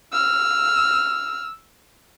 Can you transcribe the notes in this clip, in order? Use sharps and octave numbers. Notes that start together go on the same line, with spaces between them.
E6 F6